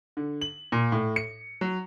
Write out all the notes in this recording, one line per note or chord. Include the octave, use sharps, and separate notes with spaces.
D3
F#7
A#2
A2
C#7
F#3